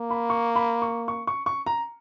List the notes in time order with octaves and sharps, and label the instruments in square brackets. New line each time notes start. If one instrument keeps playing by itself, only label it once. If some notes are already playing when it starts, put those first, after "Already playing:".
Already playing: [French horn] A#3
[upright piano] B5
C#6
B5
C#6
C#6
C#6
C#6
A#5